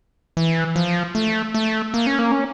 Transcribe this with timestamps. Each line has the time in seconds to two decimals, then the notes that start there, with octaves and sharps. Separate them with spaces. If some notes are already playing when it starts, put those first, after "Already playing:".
0.37 E3
0.76 F3
1.15 A3
1.54 A3
1.94 A#3
2.07 C#4
2.19 A#3
2.32 C#4